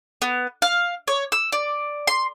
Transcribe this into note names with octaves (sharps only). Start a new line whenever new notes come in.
B3
F5
C#5
E6
D5
C6